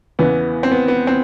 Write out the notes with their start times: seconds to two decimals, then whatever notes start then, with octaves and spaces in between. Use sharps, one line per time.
0.19 E2 C#3 E3 B3
0.63 C4
0.72 B3
0.88 B3
1.07 C4